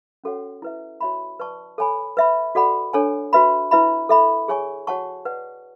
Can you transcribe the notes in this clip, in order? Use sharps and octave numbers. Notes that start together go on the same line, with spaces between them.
C#4 F#4 A4 C#5 F#5
E4 B4 E5
F#4 C#5 E5 B5
B4 D5 A5 C#6
A4 C#5 G#5 B5
B4 E5 B5
F#4 A4 D5 F#5 B5
D4 A4 C#5 G#5
F#4 B4 E5 B5
E4 B4 E5 B5
A4 E5 B5
G#4 C#5 G#5 C#6
F#4 C#5 F#5 A5 C#6
B4 D5 F#5